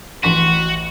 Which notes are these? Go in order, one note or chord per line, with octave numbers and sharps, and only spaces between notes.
A1 F#4 C6 B6